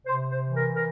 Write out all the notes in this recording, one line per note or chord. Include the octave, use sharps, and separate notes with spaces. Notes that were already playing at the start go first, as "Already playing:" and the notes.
C3 C5
C5
E3
A#4
A#4